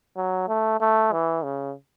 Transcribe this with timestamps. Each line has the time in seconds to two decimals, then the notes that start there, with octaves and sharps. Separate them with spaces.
0.17 F#3
0.48 A3
0.81 A3
1.12 E3
1.44 C#3